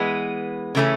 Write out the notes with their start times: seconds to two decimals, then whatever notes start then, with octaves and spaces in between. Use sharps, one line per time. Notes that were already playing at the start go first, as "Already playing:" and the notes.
Already playing: E3 G#3 B3
0.75 C#3 E3 A3 C#4